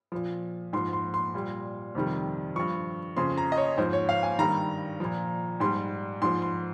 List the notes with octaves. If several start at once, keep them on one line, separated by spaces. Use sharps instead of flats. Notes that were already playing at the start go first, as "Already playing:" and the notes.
A#2 F3
G#2 F3 C6
C6
C6
A#2 G3
F2 C3 D#3 G3
G2 F3 C#6
F2 C#3 F3 C6
A#5
D#5
C#5
G#2 F3 C5
C#5
F5
G#5
G2 D#3 G3 A#5
A#2 F3
G#2 G3 C6
G#2 F3 C6
C6